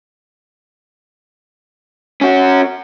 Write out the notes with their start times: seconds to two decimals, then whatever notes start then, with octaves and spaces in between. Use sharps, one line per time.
2.21 C#4 F#4